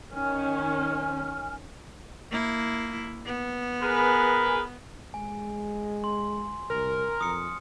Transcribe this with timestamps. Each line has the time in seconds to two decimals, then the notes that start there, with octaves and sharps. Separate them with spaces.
0.13 D#3 C#4 G#5 F6
2.31 A#3 E4
3.26 B3
3.82 G#4 A#4 B4
5.14 G#3 G#5
6.04 C6
6.70 C2 A#4 F6
7.21 F2 D#6 C#7